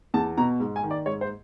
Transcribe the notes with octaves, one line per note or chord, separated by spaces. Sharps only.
E2 A5
B2 A#5
G#2
G#5
D#3
D5
G#2 C#5
C5